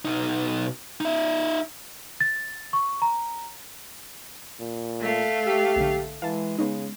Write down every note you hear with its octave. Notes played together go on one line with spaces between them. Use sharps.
B2 D#4
D#4 E5
A6
C#6
A#5
A#2
A3 F5
G4 E6 B6
B1 D3
E3 G#3 F5 A5
C#3 B3 C#4 D#4